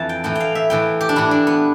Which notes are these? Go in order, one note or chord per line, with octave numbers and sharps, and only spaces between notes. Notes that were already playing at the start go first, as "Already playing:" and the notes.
Already playing: F2 E3 A5
G5
A2 E3 G5
F5 G5
E5
A2 E3 G5
G4
D4
A2 E3 E4
D4
B3